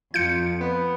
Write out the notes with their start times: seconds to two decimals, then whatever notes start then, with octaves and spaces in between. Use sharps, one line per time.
0.14 F2 F4 G6 C#7
0.61 B3